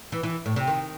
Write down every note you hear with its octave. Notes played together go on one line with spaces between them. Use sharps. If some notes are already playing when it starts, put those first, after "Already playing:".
E3
E3
A2
C3
D#3